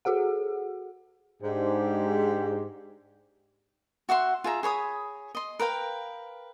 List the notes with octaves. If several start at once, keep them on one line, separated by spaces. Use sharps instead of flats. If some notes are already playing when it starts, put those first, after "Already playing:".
F#4 G#4 A4 F#5
G#2 D4 G4
F#4 E5 F#5 C6
F4 G#4 E5 A#5
G#4 C#5 B5 D#6
D#5 C6
A#4 B4 F5 G5